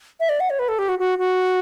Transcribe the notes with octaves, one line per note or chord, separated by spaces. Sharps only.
E5
D5
F#5
C#5
B4
A4
G4
F#4
F#4
F#4